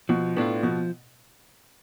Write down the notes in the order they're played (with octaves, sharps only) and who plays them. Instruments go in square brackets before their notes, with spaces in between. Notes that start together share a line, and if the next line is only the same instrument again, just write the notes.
[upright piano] B2 [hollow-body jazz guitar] F3
[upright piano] A2 [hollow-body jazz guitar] B3 D4 F4
[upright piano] B2 [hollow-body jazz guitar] F3